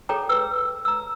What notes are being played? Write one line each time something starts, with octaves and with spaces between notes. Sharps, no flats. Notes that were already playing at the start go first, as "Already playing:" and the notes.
G#4 A4 C#5 G5 A#5 D6
B4 E6
A#5 E6